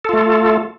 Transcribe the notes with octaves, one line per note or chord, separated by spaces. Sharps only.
A3 F4 A4